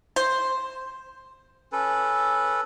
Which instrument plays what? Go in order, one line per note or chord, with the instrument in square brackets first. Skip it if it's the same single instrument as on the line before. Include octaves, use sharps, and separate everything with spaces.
[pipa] C5
[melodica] C#4 A4 B4